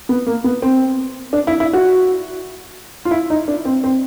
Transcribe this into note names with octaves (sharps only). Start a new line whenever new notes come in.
B3
A#3
B3
C4
D4
E4
E4
F#4
F4
E4
D#4
D4
C4
C4